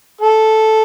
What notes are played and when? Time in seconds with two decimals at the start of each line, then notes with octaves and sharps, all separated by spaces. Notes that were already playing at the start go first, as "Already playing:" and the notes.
0.21 A4